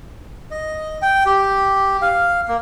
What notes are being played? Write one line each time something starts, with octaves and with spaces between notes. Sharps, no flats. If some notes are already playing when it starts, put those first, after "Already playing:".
D#5
G5
G4
F5
A#3